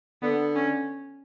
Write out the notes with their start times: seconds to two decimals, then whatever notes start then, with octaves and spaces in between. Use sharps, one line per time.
0.22 D3 B3
0.55 C#4